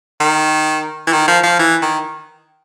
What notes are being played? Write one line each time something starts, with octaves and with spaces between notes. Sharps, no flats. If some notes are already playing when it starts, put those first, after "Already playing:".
D#3
E3
D#3
F3
F3
E3
D#3